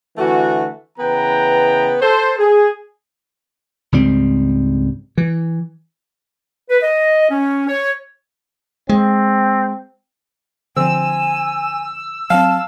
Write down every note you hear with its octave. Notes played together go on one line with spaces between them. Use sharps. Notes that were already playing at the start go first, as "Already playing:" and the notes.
D3 E3 A3 F#4
C#3 E3 B3 B4 G5 A#5
A4 C5
G#4
C#2 G#2 G3 C4
E3
B4
D#5
C#4
C#5
G#3 C4
D3 F3 C4 G#5 E6
F#3 C4 F5 A5